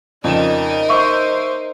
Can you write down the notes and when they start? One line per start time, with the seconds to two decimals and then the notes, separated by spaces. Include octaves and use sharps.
0.24 F2 C#3 D#4 A#4 D5 D#5 E7
0.89 C5 E5 C#6